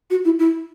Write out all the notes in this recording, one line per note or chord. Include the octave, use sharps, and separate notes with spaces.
F#4
E4
E4